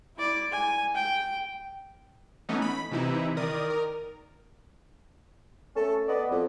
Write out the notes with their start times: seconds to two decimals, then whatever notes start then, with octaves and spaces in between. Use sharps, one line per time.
0.16 E4 D5
0.52 G#5
0.95 G5
2.49 E3 A3 B3 C#4 D#4
2.62 B5
2.91 C3 E3 D#4 E4
3.37 D#3 A#4 D5 D#6
3.70 A#4
5.75 A3 C#4 A4
6.08 B3 D5 D#5
6.31 F2